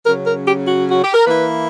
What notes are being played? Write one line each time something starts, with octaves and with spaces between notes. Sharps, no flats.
C#3 F#3 C#4 A#4
A#4
G4
F#4
F#4
G4
A#4
E3 A#3 E4 B4